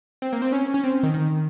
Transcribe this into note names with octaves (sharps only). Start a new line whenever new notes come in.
C4
A#3
C4
C#4
C#4
C4
D#3
D#3